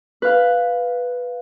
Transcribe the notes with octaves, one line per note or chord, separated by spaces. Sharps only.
B4 F5